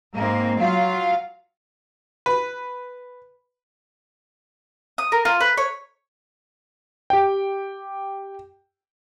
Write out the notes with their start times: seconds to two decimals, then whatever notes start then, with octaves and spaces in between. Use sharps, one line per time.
0.14 G#2 A#3 C4
0.58 F#3 F4 F5
2.26 B4
4.98 D#6
5.12 A#4
5.25 F4
5.41 B4
5.57 C#5
7.10 G4 G5